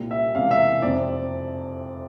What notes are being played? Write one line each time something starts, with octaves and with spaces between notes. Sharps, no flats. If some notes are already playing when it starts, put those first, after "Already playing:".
Already playing: C2 A#2 G3 A#3
E5
E1 E2 C3 F5
E5
F1 F2 C3 D5